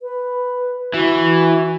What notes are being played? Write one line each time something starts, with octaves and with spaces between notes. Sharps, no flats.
B4
E3 F#4